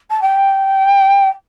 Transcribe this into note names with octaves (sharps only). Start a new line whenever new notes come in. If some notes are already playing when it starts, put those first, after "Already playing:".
A5
G5